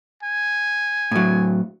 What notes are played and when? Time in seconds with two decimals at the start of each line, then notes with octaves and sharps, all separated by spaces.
0.23 G#5
1.11 A2 F#3